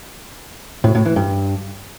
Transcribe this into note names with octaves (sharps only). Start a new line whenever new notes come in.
A2
A2
E3
G2